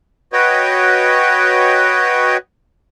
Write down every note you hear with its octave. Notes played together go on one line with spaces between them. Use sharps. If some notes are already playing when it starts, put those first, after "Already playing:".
F#4 B4 C#5 D#5 G5